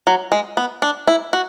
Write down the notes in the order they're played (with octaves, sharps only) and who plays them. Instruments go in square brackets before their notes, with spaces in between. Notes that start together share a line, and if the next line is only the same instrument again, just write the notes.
[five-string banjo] F#3
G#3
B3
D4
E4
F#4